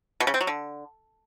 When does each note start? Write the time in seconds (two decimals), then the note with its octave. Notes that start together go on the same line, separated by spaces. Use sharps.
0.20 B2
0.27 C#3
0.34 C4
0.41 F#3
0.47 D3